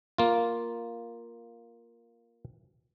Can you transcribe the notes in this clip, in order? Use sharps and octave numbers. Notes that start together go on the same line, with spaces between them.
A#3 F4